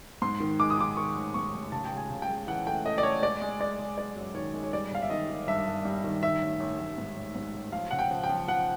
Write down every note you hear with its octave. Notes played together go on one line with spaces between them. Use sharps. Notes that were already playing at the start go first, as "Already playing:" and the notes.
G#2 C6
D#3
G#3 D6
D#6
D#3 D6
D#3 C#6
A1
G#2 C#6
A1
C#3 A5
G5
C#2
G#5
C#3
G5
C#2
E3 F#5
A3 G5
A3 D#5
D5
A3 C#5
G#3 D5
G#3
G#3 D5
G#3
G#3 D5
F#2
D#3 C#5
G#3
C#5
G3 D5
G1 F5
E5
D#3 D#5
D#3
G2 E5
G2
G3
D#3
D#3 E5
A1
A1
A1
G#2
A1
G#2
A1
F3 F5
C#3 F#5
G5
F3
G5
F3
F3 F#5